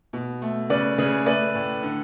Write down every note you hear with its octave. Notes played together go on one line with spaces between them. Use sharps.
B2
A3
C#3 B4 D5
C#3 G#4 B4
A3 B4 D5
A2
D3